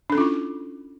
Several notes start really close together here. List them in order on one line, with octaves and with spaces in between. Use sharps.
D4 A4 C#4 F4 E4